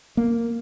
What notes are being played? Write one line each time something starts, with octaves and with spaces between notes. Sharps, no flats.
A#3